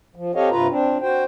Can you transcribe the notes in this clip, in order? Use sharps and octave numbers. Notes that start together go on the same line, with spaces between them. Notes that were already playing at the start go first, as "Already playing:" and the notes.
F3
C4 G4 A4 C#5 D#5 F5
G2 C3 F4 B4 A#5
C4 D4
F#4 C5 G5